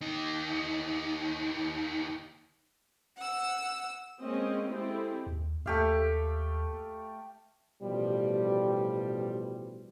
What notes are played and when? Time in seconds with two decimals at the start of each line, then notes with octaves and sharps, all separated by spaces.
0.01 D#2 D#4
3.17 F#5 E6
4.20 G#3 A#3 C4 C#4 D#5
4.68 G#3 C4 E4 G4 A4
5.27 D#2
5.66 D#2 A3 G4 F5
7.82 A1 B2 F3 G3